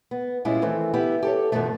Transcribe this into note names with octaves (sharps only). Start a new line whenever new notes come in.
B3
A#2 G3 G#3 C#4 E4 F4
D#3 E3 A3 C4
B3 E4 G4
G4 A4 C#5
E2 G2 B2 D#3 F3 A3